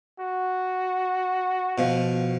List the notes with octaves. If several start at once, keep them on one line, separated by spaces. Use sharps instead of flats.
F#4
B2 F3